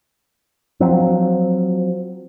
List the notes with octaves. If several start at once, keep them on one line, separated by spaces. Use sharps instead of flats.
F3 F#3 C4